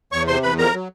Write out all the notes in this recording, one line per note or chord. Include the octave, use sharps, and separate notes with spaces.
E2 C#5 C#6
C3 C5 C6
E2 B4 B5
F2 A#4 A#5
F#3